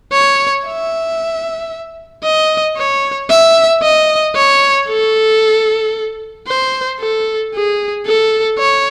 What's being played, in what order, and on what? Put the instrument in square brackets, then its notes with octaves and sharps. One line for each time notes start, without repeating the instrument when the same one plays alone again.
[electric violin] C#5
E5
D#5
C#5
E5
D#5
C#5
A4
C5
A4
G#4
A4
C#5